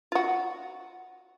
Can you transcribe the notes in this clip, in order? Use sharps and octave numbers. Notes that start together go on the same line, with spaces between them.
F4 F#4